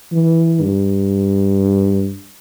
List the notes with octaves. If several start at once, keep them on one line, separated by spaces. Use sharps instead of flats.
E3
G2